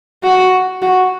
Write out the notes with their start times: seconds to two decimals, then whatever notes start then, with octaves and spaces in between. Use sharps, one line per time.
0.23 F#4
0.82 F#4